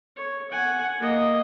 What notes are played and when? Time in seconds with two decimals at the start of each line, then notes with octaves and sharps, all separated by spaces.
0.17 C#5
0.51 F#5 G#5
0.99 A#3 D#5